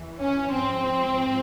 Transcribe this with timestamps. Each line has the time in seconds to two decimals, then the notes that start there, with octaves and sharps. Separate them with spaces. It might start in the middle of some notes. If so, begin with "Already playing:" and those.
Already playing: E2 E3
0.21 C#4
0.53 G#2 F3 C4